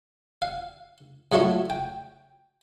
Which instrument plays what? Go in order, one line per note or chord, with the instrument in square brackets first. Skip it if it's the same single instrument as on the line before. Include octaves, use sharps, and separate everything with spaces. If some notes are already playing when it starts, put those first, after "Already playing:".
[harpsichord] F5
G#2 F#3 A3 E4 F4
G5